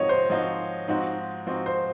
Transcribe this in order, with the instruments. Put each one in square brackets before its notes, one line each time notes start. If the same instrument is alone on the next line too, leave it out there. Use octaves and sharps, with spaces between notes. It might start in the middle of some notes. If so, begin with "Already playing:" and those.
Already playing: [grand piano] G#2 F3 C4 D#4 F#4 [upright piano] C#5 D#5
[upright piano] C5
[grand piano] G#2 F3 C4 D#4 F#4
G#2 F3 C4 D#4 F#4
G#2 F3 C4 D#4 F#4
[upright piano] C5